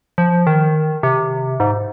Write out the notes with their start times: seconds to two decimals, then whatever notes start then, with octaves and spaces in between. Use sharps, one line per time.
0.18 F3
0.47 D#3
1.03 C3
1.60 G#2